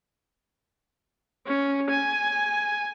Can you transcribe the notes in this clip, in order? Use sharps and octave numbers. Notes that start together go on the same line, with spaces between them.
C#4
G#5